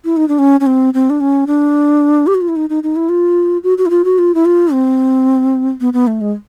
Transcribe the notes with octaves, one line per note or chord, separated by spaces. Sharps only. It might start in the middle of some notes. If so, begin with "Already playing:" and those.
E4
D#4
D4
C#4
C#4
C4
C4
D4
C#4
D4
G4
F#4
F4
E4
D#4
D#4
D#4
E4
F4
F#4
F#4
E4
F4
F#4
F4
E4
F4
C4
B3
B3
A3
G#3